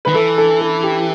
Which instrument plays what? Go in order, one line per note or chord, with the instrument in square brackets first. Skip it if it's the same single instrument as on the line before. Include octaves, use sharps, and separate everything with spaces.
[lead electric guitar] D#3 [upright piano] B4
[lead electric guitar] E3 [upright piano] A4
[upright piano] A4
A4
G4